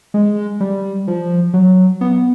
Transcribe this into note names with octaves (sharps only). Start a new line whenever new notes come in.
G#3
G3
F3
F#3
B3